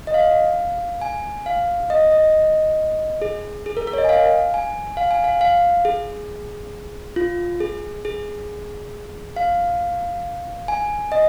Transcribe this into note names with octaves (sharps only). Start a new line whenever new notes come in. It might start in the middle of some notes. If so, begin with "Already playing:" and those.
D#5
F5
G#5
F5
D#5
D#5
G#4
G#4
A#4
A#4
C#5
D#5
G#5
F5
G#5
F5
G#5
F5
F5
G#4
F4
G#4
G#4
F5
G#5
D#5